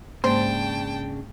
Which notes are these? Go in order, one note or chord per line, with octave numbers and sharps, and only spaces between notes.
G#2 C#3 G#3 A#3 D4 C5 G5 A5